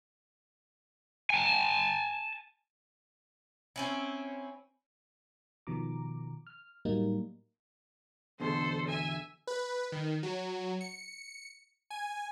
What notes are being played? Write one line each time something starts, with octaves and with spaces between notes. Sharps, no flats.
G#5 A5
C4 C#4 E4
B2 D#3 F3 A#5 D6
F6
A2 F#3 G3 A#3 D#4
E2 B2 D3 A4 C5
E5 G#5
B4
D#3
F#3
C#7
G#5